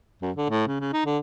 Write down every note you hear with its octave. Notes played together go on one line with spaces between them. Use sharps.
F#2
D3
A2
C#3
C#3
D#4
D3